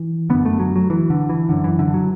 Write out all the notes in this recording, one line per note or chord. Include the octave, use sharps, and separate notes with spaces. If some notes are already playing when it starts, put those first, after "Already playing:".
Already playing: E3
F#2 D3 B3
A3
F#3
F#3
E3
D3
E3
F#2 D3
E3
D3
F#3